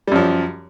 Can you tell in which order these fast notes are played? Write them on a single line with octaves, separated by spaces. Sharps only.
G3 F#2 F3